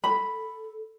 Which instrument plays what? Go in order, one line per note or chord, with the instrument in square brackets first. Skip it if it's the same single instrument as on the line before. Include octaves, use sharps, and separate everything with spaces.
[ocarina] A4 [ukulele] B5